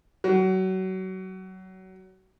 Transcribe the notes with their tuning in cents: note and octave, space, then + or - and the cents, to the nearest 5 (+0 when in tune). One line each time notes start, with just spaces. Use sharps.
F#3 +25